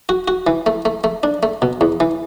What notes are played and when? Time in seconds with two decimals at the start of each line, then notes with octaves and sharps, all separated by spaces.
0.09 F#4
0.28 F#4
0.47 E3
0.66 A3
0.85 A3
1.04 A3
1.23 D4
1.43 A3
1.62 B2
1.81 E2
2.00 E3